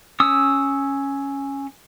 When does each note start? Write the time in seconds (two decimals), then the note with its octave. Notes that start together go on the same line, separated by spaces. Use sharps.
0.20 C#4 D#6 E6